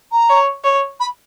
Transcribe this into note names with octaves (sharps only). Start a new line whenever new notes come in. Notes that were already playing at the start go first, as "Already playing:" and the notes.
A#5
C#5
C#5
B5